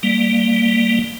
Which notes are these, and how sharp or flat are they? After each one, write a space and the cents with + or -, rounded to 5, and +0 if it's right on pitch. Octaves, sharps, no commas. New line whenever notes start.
G3 +0 A#3 -15